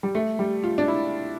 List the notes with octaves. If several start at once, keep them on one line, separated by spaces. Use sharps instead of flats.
G3
A3
G3
F4
D4
E4